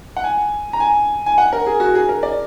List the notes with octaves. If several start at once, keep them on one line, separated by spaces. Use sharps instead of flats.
F#5
G#5
A#5
G#5
G#5
F#5
A#4
G#4
F#4
G#4
A#4
D5